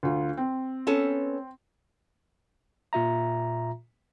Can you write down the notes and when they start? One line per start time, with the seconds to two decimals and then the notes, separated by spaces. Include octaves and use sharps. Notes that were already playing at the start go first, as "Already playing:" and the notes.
0.03 D2 F4
0.37 C4
0.87 B3 C#4 A4
2.93 A#2 F4 E5 A#5